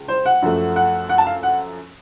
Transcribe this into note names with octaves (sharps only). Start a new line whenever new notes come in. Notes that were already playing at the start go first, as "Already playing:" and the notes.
Already playing: C#2
C5
F#5
F#2 F3 A3
F#5
F#5
A5
F5
F#5